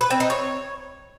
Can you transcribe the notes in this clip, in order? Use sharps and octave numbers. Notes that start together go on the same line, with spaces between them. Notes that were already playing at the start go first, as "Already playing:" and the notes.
B4
C4
D#4
C#5